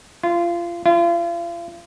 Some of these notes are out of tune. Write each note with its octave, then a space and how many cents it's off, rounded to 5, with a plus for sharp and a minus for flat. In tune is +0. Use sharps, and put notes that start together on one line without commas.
F4 -25
F4 -40